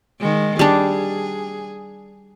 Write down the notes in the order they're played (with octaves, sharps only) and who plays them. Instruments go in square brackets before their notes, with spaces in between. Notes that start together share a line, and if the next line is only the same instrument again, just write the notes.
[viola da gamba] D#3 G#3
[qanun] G3 D4 [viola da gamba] G#4